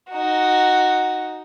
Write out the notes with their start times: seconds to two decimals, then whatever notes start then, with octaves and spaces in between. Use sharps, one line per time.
0.11 D#4 F#4